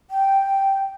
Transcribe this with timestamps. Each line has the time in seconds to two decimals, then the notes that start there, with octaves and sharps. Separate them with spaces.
0.10 G5